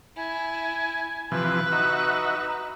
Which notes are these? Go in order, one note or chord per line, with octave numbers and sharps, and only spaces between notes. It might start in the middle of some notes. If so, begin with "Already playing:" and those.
E4 G#5
C3 E3 F3 B4 F#6
D#4 F#4 D#5 E5